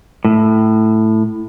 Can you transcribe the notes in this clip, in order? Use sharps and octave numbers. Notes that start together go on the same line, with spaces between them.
A2